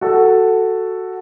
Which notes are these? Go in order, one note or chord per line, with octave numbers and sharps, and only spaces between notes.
F#4 A4